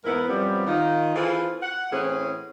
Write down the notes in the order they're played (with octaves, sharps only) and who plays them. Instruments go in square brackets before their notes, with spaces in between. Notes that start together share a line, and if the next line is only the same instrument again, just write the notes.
[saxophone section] E2 G#2 B3 E4 A#4
F#2 F3 G3 B3 C4
D#3 D#4 F4
E3 C4 F4 G#4 A4 B4
F#5
A2 E3 C4 C#4 F#4 G#4